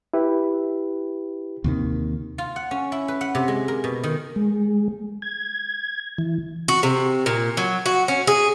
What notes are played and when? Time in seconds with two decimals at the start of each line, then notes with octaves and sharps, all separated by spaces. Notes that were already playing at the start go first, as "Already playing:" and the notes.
0.14 E4 G4 B4
1.64 D#2 C3 D#3
2.38 F4
2.56 F#5
2.71 C#4
2.92 E4
3.08 B4
3.21 F#5
3.35 C3
3.48 G#3
3.68 A#4
3.84 B2
4.03 D#3
4.36 G#3
5.22 G#6
6.18 E3
6.68 F#4
6.83 C3
7.26 A#2
7.57 F#3
7.86 F#4
8.08 C#4
8.27 G#4